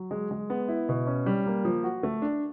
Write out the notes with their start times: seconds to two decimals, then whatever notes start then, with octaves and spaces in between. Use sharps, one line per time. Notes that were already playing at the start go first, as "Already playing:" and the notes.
Already playing: F#3
0.11 G#3
0.31 G#3
0.50 B3
0.68 E4
0.89 B2
1.07 C#4
1.26 G3
1.46 A#3
1.65 F3
1.84 F#4
2.03 A3
2.22 D4